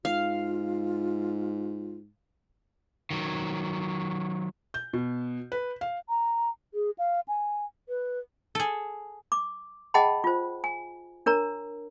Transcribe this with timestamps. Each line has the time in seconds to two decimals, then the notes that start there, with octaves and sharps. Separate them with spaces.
0.05 G#2 F4 F5
3.11 D#3 F#3
4.74 G6
4.93 B2
5.52 B4
5.81 F5
6.09 A#5
6.74 G#4
6.98 F5
7.28 G#5
7.89 B4
8.55 G#4 A4
9.32 D6
9.94 G#4 D#5 F#5 G5 A5 B5
10.24 F4 C5
10.64 G#5
11.26 D4 A#4 C#5 A#5